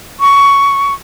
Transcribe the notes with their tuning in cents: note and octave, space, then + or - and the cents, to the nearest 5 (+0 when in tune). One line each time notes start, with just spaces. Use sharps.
C#6 +15